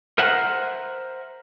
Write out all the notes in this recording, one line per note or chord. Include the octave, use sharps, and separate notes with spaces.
A#4 C5 E5 F#5